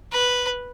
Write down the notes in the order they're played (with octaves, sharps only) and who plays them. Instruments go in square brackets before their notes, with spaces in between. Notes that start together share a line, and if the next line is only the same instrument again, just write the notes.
[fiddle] B4